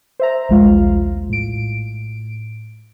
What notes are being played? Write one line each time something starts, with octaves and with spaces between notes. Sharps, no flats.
C5 E5 A#5
A#1 D#2 G#3 F4 F5
A2 D7